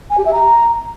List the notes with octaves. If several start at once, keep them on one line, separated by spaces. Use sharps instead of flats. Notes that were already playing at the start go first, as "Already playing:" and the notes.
G#5
G4
E5
A#5